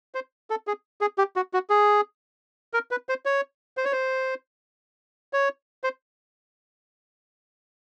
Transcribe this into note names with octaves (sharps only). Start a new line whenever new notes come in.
C5
A4
G#4
G#4
G4
F#4
F#4
G#4
A#4
B4
C5
C#5
C5
C#5
C5
C#5
C5